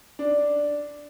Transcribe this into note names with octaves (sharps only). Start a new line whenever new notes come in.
D4